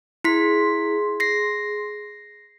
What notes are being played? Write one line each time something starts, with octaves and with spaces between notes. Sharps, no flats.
E4 G#4 C6 B6
A#6 C7